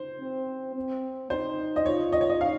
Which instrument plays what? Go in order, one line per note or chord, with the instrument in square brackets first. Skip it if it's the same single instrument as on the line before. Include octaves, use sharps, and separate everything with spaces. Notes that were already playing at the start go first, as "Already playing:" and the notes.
Already playing: [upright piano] C5
[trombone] C4
C4
[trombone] D#4 [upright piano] C5
[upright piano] D#5
[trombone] F4 [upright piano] C#5
[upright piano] D#5
C#5
D#5
F5